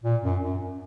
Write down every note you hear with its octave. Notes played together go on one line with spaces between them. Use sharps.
A#2
F#2
F#2